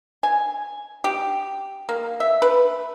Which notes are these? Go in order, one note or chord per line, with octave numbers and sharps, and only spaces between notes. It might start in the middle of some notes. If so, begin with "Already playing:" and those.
G#5
G4
A#3
E5
B4